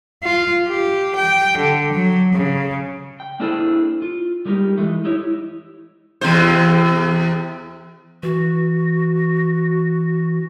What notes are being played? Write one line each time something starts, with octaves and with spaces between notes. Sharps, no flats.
F4
G4
G5
D3
F#3
C#3
G5
A#3 D4 E4 G#4 A4 C5
F4
G3 G#3 A#3 D#4 G4
E3 G#3 A3
D#4 E4 G4 C#5
E2 C3 C5
E3 F#4